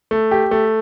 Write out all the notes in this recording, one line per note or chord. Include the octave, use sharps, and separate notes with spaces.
A3
G4
A3